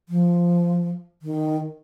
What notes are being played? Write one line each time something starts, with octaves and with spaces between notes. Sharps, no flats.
F3
D#3